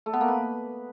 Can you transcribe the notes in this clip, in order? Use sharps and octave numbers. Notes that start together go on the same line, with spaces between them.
A3
B3
A#3
B4